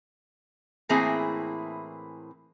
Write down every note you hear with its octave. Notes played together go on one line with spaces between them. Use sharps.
A2 E3 A#3 C4 E4 G#4